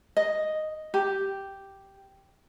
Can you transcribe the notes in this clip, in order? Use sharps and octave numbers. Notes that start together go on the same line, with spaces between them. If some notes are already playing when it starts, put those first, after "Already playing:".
D#5
G4